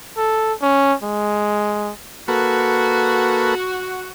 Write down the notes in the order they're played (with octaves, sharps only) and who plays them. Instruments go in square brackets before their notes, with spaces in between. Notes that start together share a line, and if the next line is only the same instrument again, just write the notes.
[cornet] A4
C#4
G#3
[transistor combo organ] A#3 A4 B4 [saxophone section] F#4